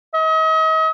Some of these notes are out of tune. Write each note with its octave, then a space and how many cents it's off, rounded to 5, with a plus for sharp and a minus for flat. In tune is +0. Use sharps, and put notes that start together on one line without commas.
D#5 +40